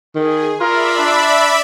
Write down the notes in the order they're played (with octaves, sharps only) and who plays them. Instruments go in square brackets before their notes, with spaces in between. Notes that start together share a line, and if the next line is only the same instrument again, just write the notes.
[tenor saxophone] D#3 [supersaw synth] G#4
[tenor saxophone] F4 [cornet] A#4 [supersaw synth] D5 E5 B5
[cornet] D4